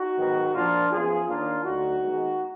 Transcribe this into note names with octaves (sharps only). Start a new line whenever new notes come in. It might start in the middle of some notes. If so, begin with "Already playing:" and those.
Already playing: D#4 F#4
G#2 D#3 F#3 B3
A#2 F3 A#3 D4 F4
F#2 F3 B3 F4 G#4
D#2 D#3 A#3 D4 F4
D2 D3 F#3 D#4 F#4
D#2 D#3 G#3 B3